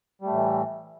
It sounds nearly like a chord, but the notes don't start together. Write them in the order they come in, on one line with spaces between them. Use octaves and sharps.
G3 A3 A2 E3